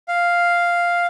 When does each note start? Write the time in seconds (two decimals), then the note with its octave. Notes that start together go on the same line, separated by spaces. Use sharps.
0.08 F5